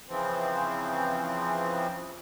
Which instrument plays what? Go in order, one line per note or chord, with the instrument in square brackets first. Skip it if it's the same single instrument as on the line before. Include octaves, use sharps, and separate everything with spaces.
[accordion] C#3 E3 F3 C4